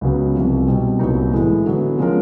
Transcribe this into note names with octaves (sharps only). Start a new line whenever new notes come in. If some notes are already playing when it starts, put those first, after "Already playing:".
C#2 C#3 F#3 B3
C2 C3 F3
B2 G3 C4
C2 A#2 F#3 B3 D#4
A2 E3 G#3
D3 F#3 B3
F3 G#3 C#4 F4 A#4